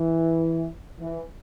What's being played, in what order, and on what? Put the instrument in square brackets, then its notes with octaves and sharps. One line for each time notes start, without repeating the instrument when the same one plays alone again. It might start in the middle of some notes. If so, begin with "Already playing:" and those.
Already playing: [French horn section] E3
E3